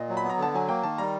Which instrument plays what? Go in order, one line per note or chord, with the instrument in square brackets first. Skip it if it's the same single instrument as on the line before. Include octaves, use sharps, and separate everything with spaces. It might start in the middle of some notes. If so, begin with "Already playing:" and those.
Already playing: [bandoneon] A#2 [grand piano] D#5
[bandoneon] F#3
[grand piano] B5
[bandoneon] B3
[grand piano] A#5
[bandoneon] D3 [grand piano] A5
[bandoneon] F#3 [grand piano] G#5
[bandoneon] A#3 [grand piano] G5
[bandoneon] D#3 [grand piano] A5
[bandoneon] G3 [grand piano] A#5